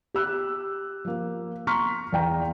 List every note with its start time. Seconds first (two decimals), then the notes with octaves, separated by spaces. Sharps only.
0.14 G4 E6 F#6
1.05 F3 A#3
1.67 A#5 C6 C#6 F6 B6
2.12 E2 D5 F5 G5 A#5